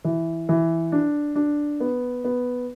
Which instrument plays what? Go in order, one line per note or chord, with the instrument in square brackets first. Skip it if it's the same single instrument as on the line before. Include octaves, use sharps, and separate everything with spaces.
[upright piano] E3
E3
D4
D4
B3
B3